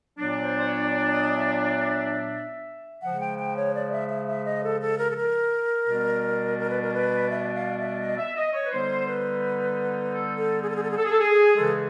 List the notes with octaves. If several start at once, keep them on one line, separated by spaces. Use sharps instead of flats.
A#2 F#3 B3 D4
C5
C5
C#5
D5
D#5
E5
C#3 F3 G#3 F#5
G5
G5
C#5
D5
E5
E5
E5
D#5
A4
A4
A#4
A4
A#4
B2 G3 B3 D4
A#4
B4
A#4
B4
E5
F5
E5
D#5
E5
D#5
C#5
B4
D3 G3 B3 D#4 C5
B4
A4
A4
G#4
A4
G#4
A4
G#4
A4
G#4
A4
G#4
C#3 E3 G#3 A4